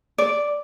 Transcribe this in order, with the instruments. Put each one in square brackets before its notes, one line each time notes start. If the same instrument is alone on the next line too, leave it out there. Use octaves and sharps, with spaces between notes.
[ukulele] D5